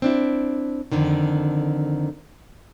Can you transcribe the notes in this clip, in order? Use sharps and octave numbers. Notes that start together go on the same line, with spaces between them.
C4 D4 E4
F2 D3 D#3